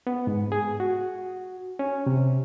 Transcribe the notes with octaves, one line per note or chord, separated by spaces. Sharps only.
B3
G#2
G#4
F#4
C#4
C3